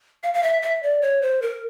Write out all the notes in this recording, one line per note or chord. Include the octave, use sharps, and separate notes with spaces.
F5
F5
E5
E5
D5
C#5
C5
A#4